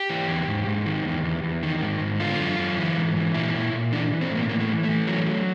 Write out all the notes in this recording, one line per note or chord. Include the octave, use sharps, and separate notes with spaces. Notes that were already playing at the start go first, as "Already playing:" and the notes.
Already playing: G4
E3
E2
G#2
G#2
D#3
E2
E2
E2
D#3
G#2
G#2
D3 F4
F#2
F#2
E3
G#2
E3
A#2 E4
A#2
A#2
E3 D4
E3
C4
A2
A#3
E3 A#3
A3
E3
E3 A3
F#3
F#3